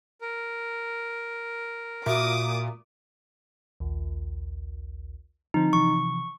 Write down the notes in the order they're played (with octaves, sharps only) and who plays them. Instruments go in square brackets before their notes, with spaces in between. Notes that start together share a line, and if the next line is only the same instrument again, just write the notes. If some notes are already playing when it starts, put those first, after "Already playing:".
[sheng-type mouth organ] A#4
[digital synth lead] A#2 [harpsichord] E4 F#4 [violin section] D6 D#6
[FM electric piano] A#1 D#2
[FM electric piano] D3 F3 C4 [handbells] D#4
[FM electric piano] C3 E3 F3 [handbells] C#6